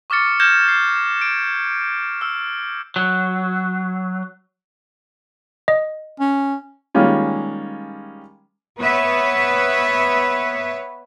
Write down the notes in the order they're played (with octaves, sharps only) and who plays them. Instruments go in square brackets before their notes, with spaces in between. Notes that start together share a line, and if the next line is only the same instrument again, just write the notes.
[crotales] C#6 D6 F6 A6 C#7
F6 G6 G#6 A#6 E7
C7
D7
E6 F6
[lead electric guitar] F#3
[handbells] D#5
[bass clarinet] C#4
[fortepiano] D#3 G3 G#3 A#3 C#4 F4
[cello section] B3 B4 C#5 E5